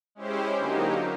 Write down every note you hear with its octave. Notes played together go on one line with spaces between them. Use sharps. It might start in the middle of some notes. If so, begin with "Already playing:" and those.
G#3 C#4 E4 G4 C5
D3 F#3 A#3 D#4 G4